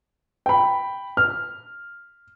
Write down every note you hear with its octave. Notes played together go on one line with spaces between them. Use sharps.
G5 B5
F6